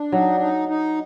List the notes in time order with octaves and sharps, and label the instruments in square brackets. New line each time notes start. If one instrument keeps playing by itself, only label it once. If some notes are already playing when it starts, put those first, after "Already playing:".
Already playing: [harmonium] D4
[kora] F#3 [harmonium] D#4
[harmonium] D#4
D#4